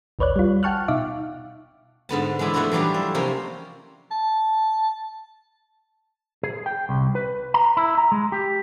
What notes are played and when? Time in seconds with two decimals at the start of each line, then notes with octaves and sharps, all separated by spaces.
0.19 A1 D#2 B4 C#5 D5 F#6
0.36 G3 F4
0.63 F#5 G5 A5 C#6 F6 F#6
0.88 B2 D#4 E5 F5 D6
2.09 G#2 D3 B3 A5
2.39 E3 G#3 B3 D4 E4
2.54 F3 A3 B3 D4 E4 F#4
2.72 E3 F#3 G3 D4 F4 G4
2.94 A4
3.15 C3 F3 A#3 C#4 C5
4.11 A5
6.43 G#4
6.66 G5
6.89 C2
7.15 B4
7.54 A#5
7.77 E4
7.98 A#5
8.12 G#3
8.32 G4